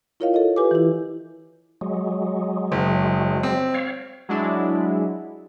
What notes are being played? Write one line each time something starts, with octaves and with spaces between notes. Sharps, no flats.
E4 F4 A#4 C#5 D#5 F5
A4 D#5
F4 G4 B4 G#5 D6
E3 E4
F#3 G#3
F#1
C4
C#5 F5
F#3 G#3 D4 E4